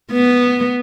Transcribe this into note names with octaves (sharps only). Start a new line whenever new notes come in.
B3